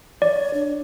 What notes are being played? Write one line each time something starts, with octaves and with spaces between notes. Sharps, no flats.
C#5 D5
D4